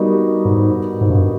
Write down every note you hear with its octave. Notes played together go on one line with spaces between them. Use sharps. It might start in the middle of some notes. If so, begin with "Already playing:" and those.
Already playing: G3 B3 D#4 F#4 A#4
G#2
G#2
G2